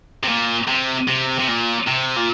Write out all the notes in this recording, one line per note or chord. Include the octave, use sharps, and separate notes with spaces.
C3
A#2
C3
C3
C3
A#2
C3
A#2